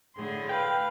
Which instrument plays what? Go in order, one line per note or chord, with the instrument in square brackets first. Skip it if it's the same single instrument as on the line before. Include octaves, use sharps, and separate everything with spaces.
[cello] A2 D3 [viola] G#4 C6
[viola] B4 F5 [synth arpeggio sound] G5